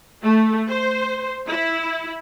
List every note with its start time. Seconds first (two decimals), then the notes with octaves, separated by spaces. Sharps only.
0.23 A3
0.68 C5
1.49 E4